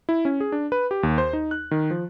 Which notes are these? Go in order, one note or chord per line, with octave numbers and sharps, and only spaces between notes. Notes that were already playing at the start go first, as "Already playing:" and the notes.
E4
C#4
G#4
D4
B4
G4
D#2
C5
D#4
F#6
D#3
F3